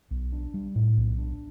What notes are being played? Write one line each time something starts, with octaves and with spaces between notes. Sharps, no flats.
B1
D4
G3
A2
B1
D4